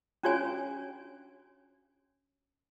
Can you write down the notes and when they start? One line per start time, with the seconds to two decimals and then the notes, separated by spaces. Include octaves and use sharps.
0.23 C#4 D4 F#4 C#5 G#5